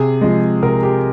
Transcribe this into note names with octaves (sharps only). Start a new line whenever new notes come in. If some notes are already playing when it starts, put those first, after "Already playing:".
Already playing: C3 G#4
F3 G#3
C3 A#4
G4